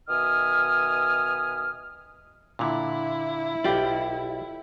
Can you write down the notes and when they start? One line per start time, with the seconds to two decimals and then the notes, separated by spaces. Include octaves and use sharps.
0.09 B2 D#3 E5 G#5 D#6 F6
2.59 A#2 D3 E4
3.64 B1 F4 G4 D5